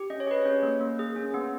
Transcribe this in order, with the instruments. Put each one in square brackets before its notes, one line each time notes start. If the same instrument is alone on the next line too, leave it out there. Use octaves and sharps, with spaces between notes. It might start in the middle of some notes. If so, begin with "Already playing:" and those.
Already playing: [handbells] G4
C#4 D#5
C#5
G#4 B4
C#4 C#5
A#3
A#3
G#4
C#4
B3